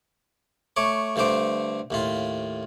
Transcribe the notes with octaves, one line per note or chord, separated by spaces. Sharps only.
A3 C#5 D6
G2 D3 A3 C5 D6
D#2 A2 F4